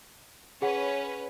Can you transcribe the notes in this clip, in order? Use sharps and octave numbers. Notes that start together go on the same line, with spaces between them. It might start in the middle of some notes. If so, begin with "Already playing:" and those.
C#4 G#4 B4 C#5 F#5